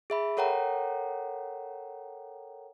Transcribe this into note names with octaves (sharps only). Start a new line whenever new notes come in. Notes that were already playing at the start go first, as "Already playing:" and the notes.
G#4 E5 B5
A4 A#4 C#5 F#5 G5 A#5